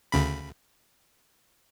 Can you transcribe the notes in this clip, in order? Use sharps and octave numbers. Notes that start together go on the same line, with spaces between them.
D2 C#3 B5